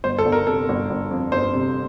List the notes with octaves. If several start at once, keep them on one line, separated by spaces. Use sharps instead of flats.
G1 C5
A4
G1
A#4
C3 A4
G1
G1
F2
G1 C5
C3